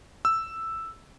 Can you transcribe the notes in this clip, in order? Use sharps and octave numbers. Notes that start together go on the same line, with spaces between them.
E6